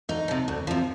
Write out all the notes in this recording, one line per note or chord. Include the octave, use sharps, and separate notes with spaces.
D2 D#4
C3 F3
D2
C3 F3